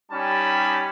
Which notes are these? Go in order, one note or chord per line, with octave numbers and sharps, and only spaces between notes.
G3 C#4 D#4 G4 A5 B5